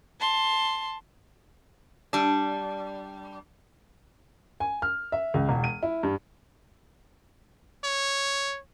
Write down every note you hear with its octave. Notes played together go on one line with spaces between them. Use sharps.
A5 C6
G3 D4
G#5
F6
E5
C#2
E1
D#7
E4
G2
C#5